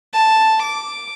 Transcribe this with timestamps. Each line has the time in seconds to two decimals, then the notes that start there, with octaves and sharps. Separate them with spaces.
0.13 A5
0.63 D6